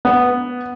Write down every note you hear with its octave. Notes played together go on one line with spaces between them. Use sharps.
B3